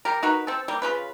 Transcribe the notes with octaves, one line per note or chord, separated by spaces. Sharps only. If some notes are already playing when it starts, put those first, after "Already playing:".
G3 G4 A#4
D#4 F#4 A#4 B4
C4 A4
G3 A#3
C#3 F4 B4